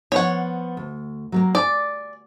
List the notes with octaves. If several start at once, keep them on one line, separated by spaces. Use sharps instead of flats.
F3 B3 C#5 F#5
D2
F#3 A3 A#3
B4 D5 G#5